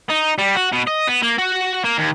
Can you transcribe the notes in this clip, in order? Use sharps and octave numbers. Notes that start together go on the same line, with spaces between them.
D#4
G3
F#4
B2
D#5
B3
A#3
F#4
A#3
D#2